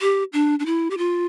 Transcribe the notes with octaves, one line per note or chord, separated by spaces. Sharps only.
G4
D4
D4
E4
G4
F4